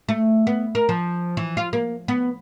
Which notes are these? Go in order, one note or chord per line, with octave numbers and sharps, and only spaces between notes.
A3
B3
A#4
F3
E3
F4
A#3
B3